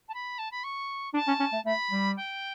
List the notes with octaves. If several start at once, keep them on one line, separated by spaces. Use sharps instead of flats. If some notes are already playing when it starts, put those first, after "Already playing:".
A5
B5
A5
B5
C#6
D4 A5
C#4
C#4
A3
A3 B5
G3
G5